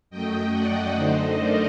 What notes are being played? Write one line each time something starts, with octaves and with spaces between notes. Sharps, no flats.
F#2 F#3 A3 D#5 G5
D5 F#5
F#2 D3 A3 D#4 C5 D#5
A#4 D5